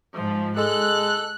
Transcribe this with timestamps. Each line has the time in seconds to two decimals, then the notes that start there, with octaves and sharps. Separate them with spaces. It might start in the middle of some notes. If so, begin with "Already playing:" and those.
0.15 G#2 F3
0.57 G#3 A4 F#6